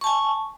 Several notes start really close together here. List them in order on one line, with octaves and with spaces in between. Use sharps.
C#6 A5 G#5